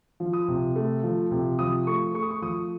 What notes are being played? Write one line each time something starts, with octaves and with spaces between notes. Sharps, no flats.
F3
D#6
C3
A3
F3
C3
F3 D#6
A3 C#6
A3 C#6
D#6
C#6
F3 D#6